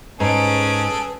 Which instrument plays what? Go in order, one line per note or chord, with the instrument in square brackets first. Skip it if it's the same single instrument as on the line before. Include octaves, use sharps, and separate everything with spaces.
[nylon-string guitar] G#2 [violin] C#4 D7 [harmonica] G#4 A4 [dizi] B4